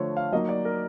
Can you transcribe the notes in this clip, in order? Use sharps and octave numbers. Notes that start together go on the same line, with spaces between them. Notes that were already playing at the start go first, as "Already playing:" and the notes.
Already playing: D3 F3 A3 C5 C#5
F5
F#3 A#3 D#4 D#5
D5
A#4